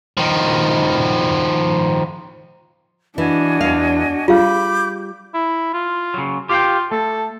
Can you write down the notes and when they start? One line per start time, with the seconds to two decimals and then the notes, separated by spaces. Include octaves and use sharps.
0.17 D#3 F3
3.18 E3 D4 F#4 D#5 G#5
3.61 E2 E4 F5
4.28 G3 F4 G#4 F5 B5 D6 G6
5.35 E4
5.74 F4
6.14 C#3 F#3
6.49 F4 G4 F5 G5
6.91 A3 A4